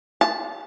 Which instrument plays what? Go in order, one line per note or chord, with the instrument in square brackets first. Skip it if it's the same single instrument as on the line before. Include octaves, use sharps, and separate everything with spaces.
[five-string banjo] A5